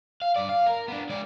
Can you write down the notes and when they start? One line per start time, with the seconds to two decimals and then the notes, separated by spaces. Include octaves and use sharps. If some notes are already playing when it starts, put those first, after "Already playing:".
0.22 F5
0.36 G2 D5
0.49 F5
0.66 A#4
0.88 B3 D4
1.09 G#3 D5